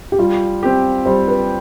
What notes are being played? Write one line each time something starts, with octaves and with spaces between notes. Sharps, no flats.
G4
G3 F4
C4 G4
G3 C5
B4